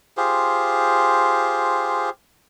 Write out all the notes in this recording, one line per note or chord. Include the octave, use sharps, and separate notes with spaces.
F4 G4 G#4 C5